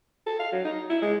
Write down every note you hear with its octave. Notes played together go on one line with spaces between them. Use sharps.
A4
F5
F#3
D#4
E4
G#3